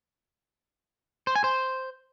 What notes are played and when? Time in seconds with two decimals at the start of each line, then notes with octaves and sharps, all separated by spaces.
1.27 C5
1.35 G#5
1.44 C5